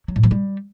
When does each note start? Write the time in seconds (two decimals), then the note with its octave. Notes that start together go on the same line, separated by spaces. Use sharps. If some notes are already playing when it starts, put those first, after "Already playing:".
0.08 F#3
0.16 A2
0.23 F3
0.31 G3